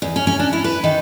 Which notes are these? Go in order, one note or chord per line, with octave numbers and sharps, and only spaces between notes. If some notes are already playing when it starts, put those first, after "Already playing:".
E2
C#4
C#4
D4
E4
B4
D#3